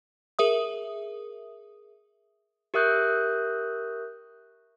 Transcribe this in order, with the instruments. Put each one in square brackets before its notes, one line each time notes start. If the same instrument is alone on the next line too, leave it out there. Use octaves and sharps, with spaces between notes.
[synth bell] G#4 A#4 E5 D#6
[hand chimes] G4 A#4 E5 D#6 F#6 G6